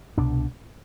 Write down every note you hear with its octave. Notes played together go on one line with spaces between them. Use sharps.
C2 B2 D4